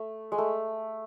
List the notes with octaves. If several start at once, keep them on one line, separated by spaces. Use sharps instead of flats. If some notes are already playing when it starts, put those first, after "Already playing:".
Already playing: A3
G#3
A3